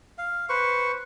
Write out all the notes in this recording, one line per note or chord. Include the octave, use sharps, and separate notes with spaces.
F5
B4 C5 C#6